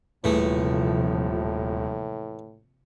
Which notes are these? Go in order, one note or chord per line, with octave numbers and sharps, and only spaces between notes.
D#1 A2 C3 E3 F3 A3 G#4